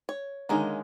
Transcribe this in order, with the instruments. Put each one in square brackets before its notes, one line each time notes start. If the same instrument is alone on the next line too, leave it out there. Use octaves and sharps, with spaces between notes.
[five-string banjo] C#5
[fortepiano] D3 D#3 G#3 [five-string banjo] A#3 C#4 D#4